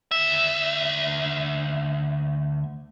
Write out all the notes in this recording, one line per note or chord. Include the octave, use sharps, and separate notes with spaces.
D2 E5